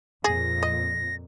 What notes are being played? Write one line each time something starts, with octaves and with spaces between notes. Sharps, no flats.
F2 A#2 G#4 A#6
D#5